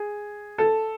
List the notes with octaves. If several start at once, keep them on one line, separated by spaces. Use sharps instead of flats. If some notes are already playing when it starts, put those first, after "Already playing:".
Already playing: G#4
A4